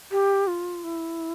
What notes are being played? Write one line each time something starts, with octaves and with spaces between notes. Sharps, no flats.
G4
F4
E4